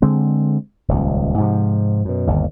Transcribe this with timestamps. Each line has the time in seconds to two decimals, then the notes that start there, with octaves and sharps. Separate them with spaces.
0.02 D3 G#3 C4
0.88 D#1 C#2
1.38 G#2 C3 F3
2.05 F#2 B2
2.27 G1 D#2